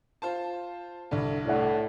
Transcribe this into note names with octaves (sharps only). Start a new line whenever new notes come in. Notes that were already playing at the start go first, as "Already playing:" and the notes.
F4 C5 A5
C2 G2 D3
A2 D5 F#5